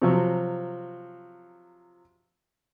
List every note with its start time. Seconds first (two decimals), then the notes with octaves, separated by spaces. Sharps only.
0.02 C3 F3 F#3